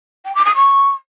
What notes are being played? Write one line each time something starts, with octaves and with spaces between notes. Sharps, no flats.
G5
D6
D#6
C#6